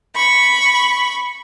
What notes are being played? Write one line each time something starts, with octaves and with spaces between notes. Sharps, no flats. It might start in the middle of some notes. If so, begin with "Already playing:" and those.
B5 C#6